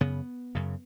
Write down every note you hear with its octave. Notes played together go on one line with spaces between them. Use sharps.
F#2 C#3 B3
F#2 C#3